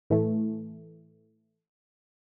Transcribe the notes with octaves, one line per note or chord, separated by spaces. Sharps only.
A2 E3 A3